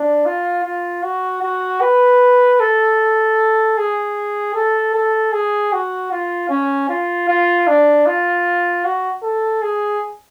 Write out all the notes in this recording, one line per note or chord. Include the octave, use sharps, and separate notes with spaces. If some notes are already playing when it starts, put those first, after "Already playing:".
Already playing: D4
F4
F4
F#4
F#4
B4
A4
G#4
A4
A4
G#4
F#4
F4
C#4
F4
F4
D4
F4
F#4
A4
G#4